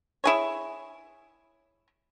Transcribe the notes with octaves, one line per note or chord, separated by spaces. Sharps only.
E4 G#4 C#5